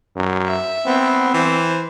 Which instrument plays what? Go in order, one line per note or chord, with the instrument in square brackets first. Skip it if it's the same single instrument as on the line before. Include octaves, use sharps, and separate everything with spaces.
[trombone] F#2
[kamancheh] E5
[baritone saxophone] B3 [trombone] C4
[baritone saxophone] E3 [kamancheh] C5